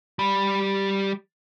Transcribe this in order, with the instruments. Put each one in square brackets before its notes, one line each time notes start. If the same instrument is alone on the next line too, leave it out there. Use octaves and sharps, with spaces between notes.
[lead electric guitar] G3 B5